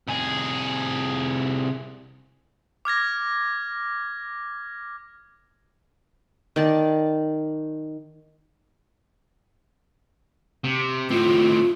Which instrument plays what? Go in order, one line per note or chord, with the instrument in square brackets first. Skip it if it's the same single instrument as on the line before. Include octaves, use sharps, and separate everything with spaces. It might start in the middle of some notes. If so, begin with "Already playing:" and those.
[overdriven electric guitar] C2 G#4
[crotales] D6 F6 G#6 A#6
[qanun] D#3 D5 A5
[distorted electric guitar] C3
[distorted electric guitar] A2 C4 [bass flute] F4